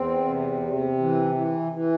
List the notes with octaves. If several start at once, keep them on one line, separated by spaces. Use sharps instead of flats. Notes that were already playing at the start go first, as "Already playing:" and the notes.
Already playing: E2 C4
C3
C3
E3
E3
E3